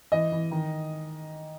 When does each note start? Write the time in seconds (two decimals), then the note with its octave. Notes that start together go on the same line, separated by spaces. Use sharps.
0.12 E3 D#5
0.32 E3
0.51 D#3